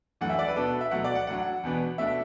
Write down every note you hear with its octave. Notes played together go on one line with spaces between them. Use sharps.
F#2 E3 A3 D4 F#5
E5
D5
B4
B2 B3 D4 A4
E5
B2 F#3 A3 F#5
D5
F#5
A2 F#3 D4 F#5
E2 B2 B3 D4
B2 A3 D4 E5